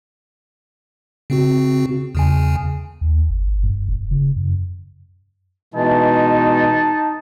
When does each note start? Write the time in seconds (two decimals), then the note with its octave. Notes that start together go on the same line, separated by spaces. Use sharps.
1.30 C#3 C4 F#4
2.15 E2 C#3 G#5
3.01 D#2
3.29 F#1
3.49 F#1
3.63 G2
3.88 F1
4.11 C#3
4.36 F#2
5.74 B2 E3 G#3 D#4 A5